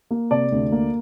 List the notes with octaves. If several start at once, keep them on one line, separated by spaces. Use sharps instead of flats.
A#3
C3 D5
D2
A#3